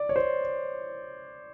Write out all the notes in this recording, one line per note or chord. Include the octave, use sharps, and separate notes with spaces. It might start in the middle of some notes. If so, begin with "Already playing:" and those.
Already playing: D5
C#5
C5